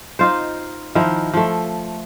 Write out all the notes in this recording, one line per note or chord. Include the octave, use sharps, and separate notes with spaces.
D#4 F4 C5
D#3 F3 E4 A#4
F3 A3